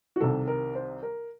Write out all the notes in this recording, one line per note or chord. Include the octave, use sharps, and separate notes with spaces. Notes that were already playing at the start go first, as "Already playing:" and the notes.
F#4
C2 C3 D#3 A4
A#4
C5
A#4